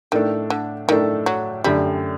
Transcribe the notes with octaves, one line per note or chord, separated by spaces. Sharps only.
A2 D#3 A3 D4 A4
D3
A2 D#3 A3 D4 A4
F#3
F#2 D3 G3 A3 D4 G4